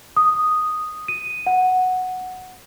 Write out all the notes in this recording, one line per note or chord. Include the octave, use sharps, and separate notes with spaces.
D#6
D#7
F#5